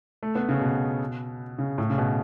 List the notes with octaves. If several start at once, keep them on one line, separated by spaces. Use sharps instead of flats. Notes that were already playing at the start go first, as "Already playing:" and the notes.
A3
B3
C#3
B2
C#3
A2
C#3
B2